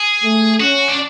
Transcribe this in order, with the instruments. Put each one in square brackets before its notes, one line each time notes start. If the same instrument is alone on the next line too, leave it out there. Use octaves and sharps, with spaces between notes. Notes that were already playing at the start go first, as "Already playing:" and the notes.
Already playing: [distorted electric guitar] G#4
[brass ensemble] A3
[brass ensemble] C#4 [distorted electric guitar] F#4
[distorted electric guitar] D4